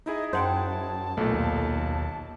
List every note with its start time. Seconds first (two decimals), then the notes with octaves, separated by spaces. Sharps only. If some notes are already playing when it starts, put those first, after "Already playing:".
0.06 D#4 E4 G#4 D#5
0.33 F#2 C5 F#5 G5 A5
1.17 B1 A#2 A3
1.31 D#2